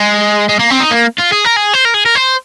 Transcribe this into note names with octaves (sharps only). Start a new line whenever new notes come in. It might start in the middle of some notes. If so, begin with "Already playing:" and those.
Already playing: G#3
G#3
A#3
C4
D#4
A#3
F4
G#4
A#4
G#4
C5
A#4
G#4
A#4
C5